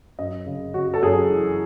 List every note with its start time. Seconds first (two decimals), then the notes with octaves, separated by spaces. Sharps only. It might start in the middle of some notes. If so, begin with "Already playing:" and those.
0.19 F#2 D#5
0.46 C#3
0.74 C#3 F#4
0.94 A4
1.03 F#2 G#4
1.30 E3